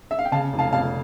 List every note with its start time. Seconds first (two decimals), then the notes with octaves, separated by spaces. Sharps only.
0.11 E5
0.19 F5
0.25 G5
0.32 C#3 F5 A5
0.53 F1
0.59 F5 A5
0.73 F1 F5 A5